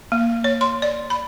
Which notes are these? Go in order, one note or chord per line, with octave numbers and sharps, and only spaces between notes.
A#3
C#5
C6
D5
B5